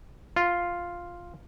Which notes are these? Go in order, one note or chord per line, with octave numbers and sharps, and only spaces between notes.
F4